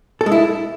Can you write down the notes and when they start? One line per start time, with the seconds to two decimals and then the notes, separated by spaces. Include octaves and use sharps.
0.21 A4
0.26 G#3
0.32 E4